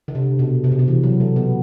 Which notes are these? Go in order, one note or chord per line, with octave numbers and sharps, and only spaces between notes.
D3
C3
B2
C3
B2
C3
E3
F#3
A3
B2 B3